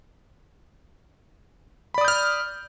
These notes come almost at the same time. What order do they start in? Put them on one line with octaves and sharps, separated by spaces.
B5 D5 D#6 G6 F6